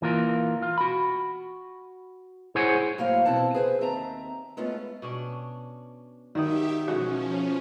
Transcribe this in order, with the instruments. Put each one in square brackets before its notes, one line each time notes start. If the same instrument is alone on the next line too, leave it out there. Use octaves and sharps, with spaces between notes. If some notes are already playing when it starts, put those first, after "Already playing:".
[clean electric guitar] E3 A#3 F4
F4
F#4 B5
E4 G#4 C5 C#5 F#5 G#5
[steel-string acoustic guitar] A2 F#3 A#3 C5 F5
E2 B2 C4 E4 F#5 A5
G#4 B4 C5
D#2 C4 E5 A5 A#5
G#3 A3 B3 C#4 F4
[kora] B2 C#4 D4
[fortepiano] D#3 D#6 [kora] F#3 E4 [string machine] G4 E5
[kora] B2 E3 G#3 [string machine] F3 C#4 [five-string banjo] F#4